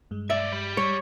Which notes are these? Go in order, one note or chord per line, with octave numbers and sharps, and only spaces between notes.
G2 G#3
B1 D5 E5
G4 B5
G3 C#5